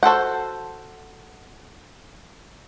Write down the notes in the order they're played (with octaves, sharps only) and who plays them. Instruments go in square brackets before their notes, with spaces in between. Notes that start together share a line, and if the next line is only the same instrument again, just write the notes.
[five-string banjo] F#4 A4 C5 F#5